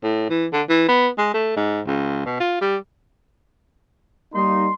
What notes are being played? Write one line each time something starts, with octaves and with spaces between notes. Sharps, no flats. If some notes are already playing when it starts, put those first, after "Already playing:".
A2
E3
D3
E3
B3
G#3
A3
G#2
C#2
B2
F4
G3
G3 A#3 D#4 C6